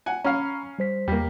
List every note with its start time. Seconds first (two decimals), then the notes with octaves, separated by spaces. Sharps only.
0.06 F#5 G#5
0.24 C#4 F5 A#5 B5 F6
0.79 G3 C5 B6
1.08 E2 G3 A#3 B6